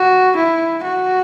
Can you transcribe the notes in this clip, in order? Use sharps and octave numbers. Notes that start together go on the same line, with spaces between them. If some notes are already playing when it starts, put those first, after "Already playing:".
Already playing: F#4
E4
F#4